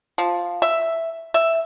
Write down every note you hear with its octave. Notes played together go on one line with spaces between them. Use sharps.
F3
E5
E5